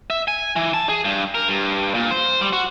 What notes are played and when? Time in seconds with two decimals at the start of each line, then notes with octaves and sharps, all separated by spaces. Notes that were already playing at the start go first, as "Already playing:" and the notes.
0.10 E5
0.28 G#5
0.56 E3
0.74 A5
0.89 G#4
1.04 G2
1.35 A#4
1.48 G2
1.94 A#2
2.11 C5
2.41 G3
2.53 F#4